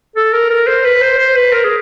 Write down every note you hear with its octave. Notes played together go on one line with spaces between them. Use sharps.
A4
A#4
A#4
C5
B4
C5
C5
B4
A#4
G#4